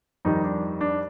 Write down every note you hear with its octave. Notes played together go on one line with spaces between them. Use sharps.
F2 D#3 G3 D#4
D4
D4